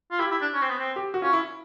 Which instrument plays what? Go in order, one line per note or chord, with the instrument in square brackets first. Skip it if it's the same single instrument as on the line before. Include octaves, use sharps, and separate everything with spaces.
[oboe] F4
[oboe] E4 [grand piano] G4
[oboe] E4
D4
C#4
C4
B3
C4
[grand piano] G4
F#4
[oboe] C#4 [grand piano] F4
[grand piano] E4